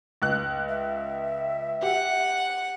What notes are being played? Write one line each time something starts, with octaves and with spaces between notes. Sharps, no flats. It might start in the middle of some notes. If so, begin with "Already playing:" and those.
C#2 F#6
E5
G4 F#5